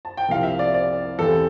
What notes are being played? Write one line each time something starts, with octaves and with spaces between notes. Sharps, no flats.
A5
G5
C2 C3 F3 A#3 F5
E5
D5
D5
E2 E3 G3 C4 A4